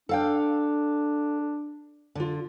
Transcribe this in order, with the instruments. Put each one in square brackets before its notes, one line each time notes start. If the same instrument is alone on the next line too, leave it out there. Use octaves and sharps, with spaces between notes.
[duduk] D4 [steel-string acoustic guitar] A4 F5 G5
[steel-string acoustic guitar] D3 F4